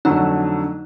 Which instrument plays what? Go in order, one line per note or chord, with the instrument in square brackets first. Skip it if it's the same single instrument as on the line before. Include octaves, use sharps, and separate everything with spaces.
[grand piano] F2 D3 F#3 A3 [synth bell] D#4